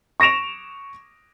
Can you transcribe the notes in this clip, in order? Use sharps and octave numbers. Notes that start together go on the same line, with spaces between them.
C#6 A#6 D7 E7 F7